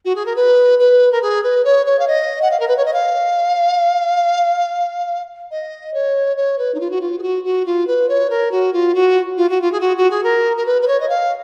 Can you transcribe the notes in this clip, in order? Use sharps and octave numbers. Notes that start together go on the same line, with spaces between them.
F#4
G#4
A#4
B4
B4
A#4
G#4
B4
C#5
C#5
F5
D#5
F#5
F5
A#4
B4
C#5
D#5
F5
D#5
C#5
C#5
B4
D#4
F4
F#4
F4
G#4
F#4
F#4
F4
B4
C#5
A#4
F#4
F4
F#4
F4
F#4
F4
G#4
F#4
F#4
G#4
A#4
A#4
B4
B4
C#5
D#5
F5